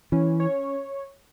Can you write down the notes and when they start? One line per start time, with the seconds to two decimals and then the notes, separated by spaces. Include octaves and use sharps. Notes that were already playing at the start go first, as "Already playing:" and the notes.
0.12 E3 C#4
0.40 C#5